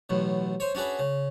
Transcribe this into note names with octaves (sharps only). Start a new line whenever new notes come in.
A1 F#2 B2
C5 C#5
C#4 D4 F#4 G#4 B4
C#3